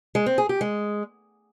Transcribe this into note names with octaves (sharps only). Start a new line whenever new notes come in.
G#3
C4
G#4
G4
G#3